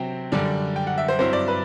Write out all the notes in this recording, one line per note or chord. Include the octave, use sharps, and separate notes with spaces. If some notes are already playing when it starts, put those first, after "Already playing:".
Already playing: C3 F#3 C4 G5
F#2 D3 G3 D4
G5
F#5
E5
C5
G2 F#3 C4 E4 C5
D5
B4